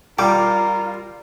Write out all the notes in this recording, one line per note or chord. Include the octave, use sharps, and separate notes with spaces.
G3 F4 A#4 G5 D6